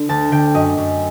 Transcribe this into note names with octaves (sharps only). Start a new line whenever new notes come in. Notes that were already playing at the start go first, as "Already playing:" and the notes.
Already playing: D3
D2 A5
D3 G5
F#2 D#5
F#2